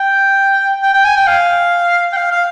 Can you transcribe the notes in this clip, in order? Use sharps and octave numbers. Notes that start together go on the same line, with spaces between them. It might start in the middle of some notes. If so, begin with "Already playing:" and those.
Already playing: G5
G5
G5
G#5
G5
F5
G5
F5
F5